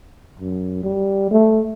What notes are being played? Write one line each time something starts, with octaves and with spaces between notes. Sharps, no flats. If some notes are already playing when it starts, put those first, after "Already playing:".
F#2
G3
A3